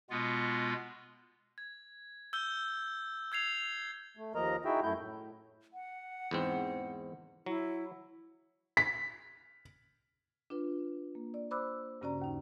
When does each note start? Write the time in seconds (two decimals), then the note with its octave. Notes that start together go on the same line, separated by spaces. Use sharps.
0.10 B2 G#3 B3 F4
1.58 G#6
2.33 E6 G6 G7
3.32 E6 G#6 C7 F7
4.17 A3
4.35 D#2 F3 A#3 A#4 D#5 A#5
4.65 D#4 E4 F#4 G#4 E5 G5
4.83 F#2 A3 E4 G6
4.99 A2
5.74 F#5
6.31 E2 G#2 C4
7.46 F#3 E4
8.77 B6
10.50 D4 F4 B4
11.15 A#3
11.34 D5
11.51 C5 D5 B5 D6 E6 F#6
12.01 G2 C#3 C#4 F#4 D5 A#5
12.22 D#2 D#4